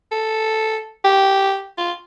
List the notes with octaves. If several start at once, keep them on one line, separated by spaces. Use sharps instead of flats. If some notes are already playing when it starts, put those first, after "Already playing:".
A4
G4
F4